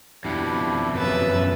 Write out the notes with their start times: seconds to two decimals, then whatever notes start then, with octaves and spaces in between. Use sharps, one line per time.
0.24 F2 B2 D4 E4 G4
0.94 F#2 C#3 B4 E5 A6